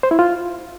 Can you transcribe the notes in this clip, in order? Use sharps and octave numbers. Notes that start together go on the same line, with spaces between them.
C5
E4
F4